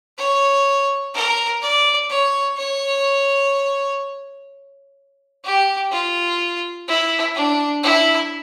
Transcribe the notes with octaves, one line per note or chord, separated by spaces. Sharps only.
C#5
A#4
D5
C#5
C#5
G4
F4
E4
D4
E4